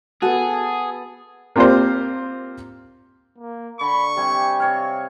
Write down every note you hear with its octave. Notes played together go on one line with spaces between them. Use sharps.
B3 F#4 G#4 A4
A#3 C4 F4 G4 A#4 C5
A#3
D3 B5 C#6
C3 G3 G4 G#5
C3 C#5 F5